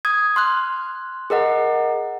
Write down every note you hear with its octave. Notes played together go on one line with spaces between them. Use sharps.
D#6 G#6
C6 F6 F#6
G#4 A#4 D#5 F#5